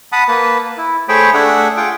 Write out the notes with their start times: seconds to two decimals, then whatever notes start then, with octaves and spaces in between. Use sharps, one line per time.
0.12 F#5 A5 B5 D#6
0.28 A#3 B4 A5
0.77 E4
1.09 A3 G#4 C5 C#5 G5 B5
1.34 A3 D4 G#4 E5 F#5
1.77 F4 G#4 F#5 G5